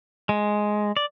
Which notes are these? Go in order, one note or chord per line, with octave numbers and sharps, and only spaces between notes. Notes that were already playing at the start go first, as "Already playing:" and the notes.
G#3
D5